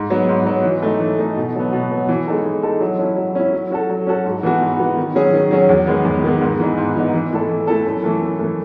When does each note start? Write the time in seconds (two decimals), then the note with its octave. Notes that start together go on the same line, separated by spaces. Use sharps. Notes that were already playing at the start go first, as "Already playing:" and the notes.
Already playing: G#2
0.10 F#3 B3
0.29 G#2
0.46 F#3 B3
0.65 E3
0.82 A3 D#4
1.00 E3
1.19 A3 D#4
1.37 B2
1.55 F#3 B3
1.73 B2
1.90 F#3 B3
2.09 E3
2.27 G#3 D#4 A4
2.45 E3
2.63 G#3 D#4 A4
2.80 F#3
2.98 C#4 E4
3.17 F#3
3.35 C#4 E4
3.53 F#3
3.71 C#4 F#4 A4
3.90 F#3
4.06 C#4 F#4 A4
4.25 G#2
4.43 E3 B3 F#4
4.61 G#2
4.79 E3 B3 F#4
4.97 D#3
5.15 F#3 C#4 G#4
5.33 D#3
5.51 F#3 C#4 G#4
5.69 E2
5.87 D#3 G#3 B3
6.05 E2
6.24 D#3 G#3 B3
6.41 G#2
6.60 E3 B3 D#4
6.77 G#2
6.95 E3 B3 D#4
7.14 E3
7.32 A3 E4 A4
7.49 E3
7.67 A3 E4 A4
7.86 F#2
8.04 E3 A3
8.21 F#2
8.39 E3 A3